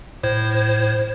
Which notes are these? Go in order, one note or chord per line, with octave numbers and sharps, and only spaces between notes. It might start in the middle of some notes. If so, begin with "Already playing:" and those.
A2 C5 G#6